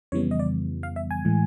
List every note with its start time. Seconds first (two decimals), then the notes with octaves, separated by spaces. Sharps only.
0.12 F2 C#3 E3 G3 B3 C#5
0.31 D#5
0.39 D5
0.83 F5
0.96 E5
1.11 G#5
1.25 A2 E3 G#3